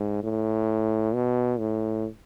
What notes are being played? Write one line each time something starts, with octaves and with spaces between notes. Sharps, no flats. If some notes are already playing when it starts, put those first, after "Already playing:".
Already playing: G#2
A2
B2
A2